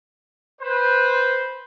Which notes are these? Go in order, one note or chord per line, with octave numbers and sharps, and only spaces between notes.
B4 C5